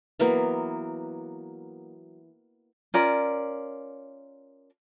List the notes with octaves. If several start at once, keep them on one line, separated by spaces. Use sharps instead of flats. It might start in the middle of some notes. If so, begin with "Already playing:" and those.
E3 F#3 A#3 B3
C#4 F4 A#4 D5